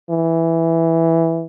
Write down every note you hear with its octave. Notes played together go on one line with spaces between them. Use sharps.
E3